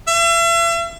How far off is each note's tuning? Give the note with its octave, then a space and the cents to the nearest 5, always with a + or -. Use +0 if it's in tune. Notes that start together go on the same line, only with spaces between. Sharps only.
E5 +40